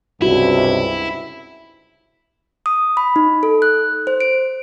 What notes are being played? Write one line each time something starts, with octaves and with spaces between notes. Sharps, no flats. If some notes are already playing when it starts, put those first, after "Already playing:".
C#2 G2 C3 E4 F#4
D#6
B5
D#4
A4
F#6
C5
D7